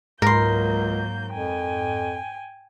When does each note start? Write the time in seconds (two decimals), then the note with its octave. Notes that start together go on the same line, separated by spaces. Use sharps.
0.22 C#2 G#2 F#3 A#3 A#4 C6 G6
1.32 F2 G5 G#5